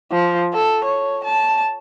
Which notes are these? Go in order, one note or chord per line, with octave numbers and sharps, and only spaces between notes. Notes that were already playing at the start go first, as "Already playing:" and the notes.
F3
A4
C#5
A5